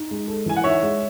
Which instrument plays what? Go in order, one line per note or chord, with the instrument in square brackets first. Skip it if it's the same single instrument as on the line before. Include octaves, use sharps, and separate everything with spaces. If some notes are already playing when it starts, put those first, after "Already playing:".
Already playing: [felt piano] D#4
G#3
A4
[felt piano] E3 [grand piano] G#5
[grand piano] F#5
[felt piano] D#4 [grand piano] C#5 E5
[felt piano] G#3